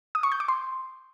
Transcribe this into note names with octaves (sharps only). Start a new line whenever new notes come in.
D#6
C#6
G6
D6
C6